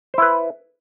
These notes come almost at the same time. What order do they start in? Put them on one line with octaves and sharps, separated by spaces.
C5 E4 B4